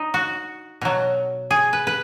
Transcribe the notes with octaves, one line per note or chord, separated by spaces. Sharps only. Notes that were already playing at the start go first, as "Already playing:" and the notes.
Already playing: D#4
F#4
B2 F#3
G#4
B4
B4